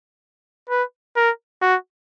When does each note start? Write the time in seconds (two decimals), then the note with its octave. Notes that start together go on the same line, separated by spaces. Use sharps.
0.69 B4
1.16 A#4
1.62 F#4